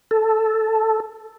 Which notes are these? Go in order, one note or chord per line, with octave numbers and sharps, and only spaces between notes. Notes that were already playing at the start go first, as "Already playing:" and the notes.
A4